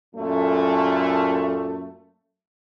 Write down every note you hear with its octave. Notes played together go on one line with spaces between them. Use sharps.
F#2 A#2 A3